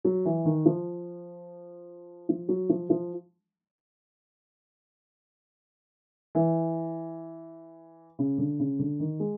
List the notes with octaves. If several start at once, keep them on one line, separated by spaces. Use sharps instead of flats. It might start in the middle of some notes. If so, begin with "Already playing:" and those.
F#3
E3
D#3
F3
F3
F#3
F3
F3
E3
C#3
D3
C#3
D3
D#3
G#3